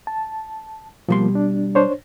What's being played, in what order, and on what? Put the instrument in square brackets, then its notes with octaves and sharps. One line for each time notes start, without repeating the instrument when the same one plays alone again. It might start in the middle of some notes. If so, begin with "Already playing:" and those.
[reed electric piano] A5
[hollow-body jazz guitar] B2 G3 C6 [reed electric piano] F3 A#3
[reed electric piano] D4
D4 C5 C#5